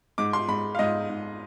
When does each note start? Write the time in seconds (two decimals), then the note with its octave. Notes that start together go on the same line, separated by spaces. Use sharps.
0.18 G#2 D6
0.33 C6
0.48 G#2 B5
0.75 F5
0.79 G#2 D#5
1.10 G#2